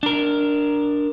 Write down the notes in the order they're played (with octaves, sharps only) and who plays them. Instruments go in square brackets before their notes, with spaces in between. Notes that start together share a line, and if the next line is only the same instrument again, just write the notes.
[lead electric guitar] D4 A#4